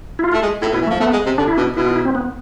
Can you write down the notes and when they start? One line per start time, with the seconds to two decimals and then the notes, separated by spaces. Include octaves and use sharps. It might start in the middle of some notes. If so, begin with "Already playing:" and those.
0.19 E4
0.23 F4
0.33 A3
0.42 G#3
0.62 A2 E4
0.71 B2
0.74 E4
0.81 E3
0.87 A3
0.91 F3
1.00 A3 B3
1.13 G#3
1.26 C3
1.38 D3 D4
1.48 E4
1.57 B2 D4
1.76 B2 E4
1.86 F4
1.96 E4
2.05 C4
2.15 B3